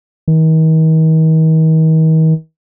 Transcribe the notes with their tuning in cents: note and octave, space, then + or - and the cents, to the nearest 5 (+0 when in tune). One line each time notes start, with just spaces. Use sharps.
D#3 +40